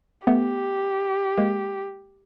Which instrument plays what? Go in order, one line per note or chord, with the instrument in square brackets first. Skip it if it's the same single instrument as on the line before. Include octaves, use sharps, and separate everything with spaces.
[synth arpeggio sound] A3 B3 [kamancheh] G4
[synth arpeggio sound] G#3 A#3